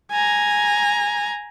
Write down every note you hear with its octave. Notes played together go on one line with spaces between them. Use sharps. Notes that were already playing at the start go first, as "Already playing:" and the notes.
G#5 A#5